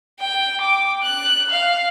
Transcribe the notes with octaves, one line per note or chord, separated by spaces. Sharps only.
G5
D6
F#6
F5